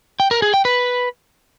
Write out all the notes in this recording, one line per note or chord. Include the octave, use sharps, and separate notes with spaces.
G5
A#4
G#4
G5
B4